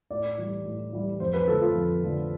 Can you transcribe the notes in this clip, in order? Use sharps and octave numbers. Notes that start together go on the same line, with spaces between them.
A2 D5
E3 G3
A2
E3 G3
F2 C5
B4
D3 F3 A3 A4
F4
F2
D3 F3 A3